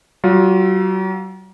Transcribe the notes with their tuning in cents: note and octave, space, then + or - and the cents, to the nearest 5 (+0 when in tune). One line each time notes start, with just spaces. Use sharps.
F#3 +40 F4 +25